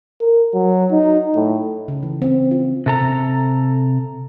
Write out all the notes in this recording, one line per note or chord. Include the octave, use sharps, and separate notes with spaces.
A#4
F#3
D#4
A2
C#3
E3
C4
F4
C3 A4 A#5